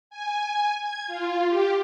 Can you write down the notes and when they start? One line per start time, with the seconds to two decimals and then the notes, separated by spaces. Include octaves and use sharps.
0.10 G#5
0.78 G#6
1.07 F4
1.48 G4